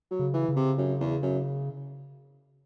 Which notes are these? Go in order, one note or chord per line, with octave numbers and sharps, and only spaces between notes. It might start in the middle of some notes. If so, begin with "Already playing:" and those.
F#3
C#3
E3
C#3
C3
F#2
E2
F#2